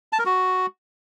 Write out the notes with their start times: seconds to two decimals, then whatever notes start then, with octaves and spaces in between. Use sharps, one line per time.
0.13 A5
0.19 A#4
0.25 F#4